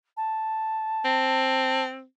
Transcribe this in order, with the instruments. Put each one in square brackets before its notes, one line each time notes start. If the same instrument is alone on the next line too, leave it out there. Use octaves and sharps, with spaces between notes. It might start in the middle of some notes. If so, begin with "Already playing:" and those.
[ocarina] A5
[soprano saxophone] C4